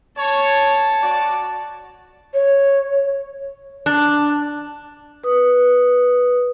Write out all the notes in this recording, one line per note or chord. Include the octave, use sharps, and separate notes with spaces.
C#5 A5
F#4 D5
C#5
D4
B4 D#6